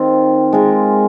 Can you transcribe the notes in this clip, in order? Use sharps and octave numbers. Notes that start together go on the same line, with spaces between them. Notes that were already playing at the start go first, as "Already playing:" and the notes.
Already playing: D#3 C4 F4
G#3 F4 A#4